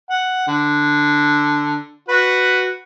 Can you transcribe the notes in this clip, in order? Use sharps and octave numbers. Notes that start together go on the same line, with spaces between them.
F#5
D3
F#4 B4